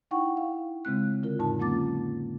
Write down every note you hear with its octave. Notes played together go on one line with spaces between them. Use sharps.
D#4 E4 F#5 G5 C#6
F5
C#3 G#3 C4 F#6
D3 F4 A#4
F2 A2 D3 D#4 A5
F#3 A#3 C#4 F4 D6 A6